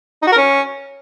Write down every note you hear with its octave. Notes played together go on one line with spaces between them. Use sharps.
D#4
F#4
A#4
C#4